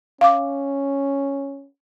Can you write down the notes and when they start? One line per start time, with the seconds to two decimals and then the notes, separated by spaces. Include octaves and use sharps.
0.21 C#4 F5 D6